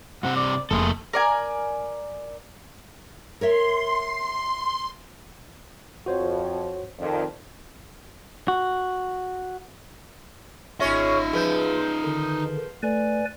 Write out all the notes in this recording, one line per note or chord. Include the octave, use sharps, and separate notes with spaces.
G2 C3 C4 F#5
D5
F1 G#3 A#3 A4
A#4 D5 G#5
A#4 C#5 E5 C6
F2 F#4 C5 C#5
F2 D#3 D5
F#4
G#1 C#4 D#4 F4 G#4 C#5 E5 A#6
F3 G#4 B4 G6
D3 D#3
A3 B4 D5 G#5